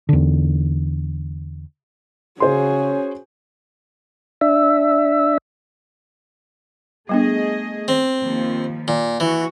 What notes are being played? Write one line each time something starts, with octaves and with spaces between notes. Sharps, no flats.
E2 D3
C#3 C#4 F#4 G#4 C5 C6
D4 E5
G3 A3 B3 D4 G#4 D#5
C4
D#2 F3
A#2
E3 F#4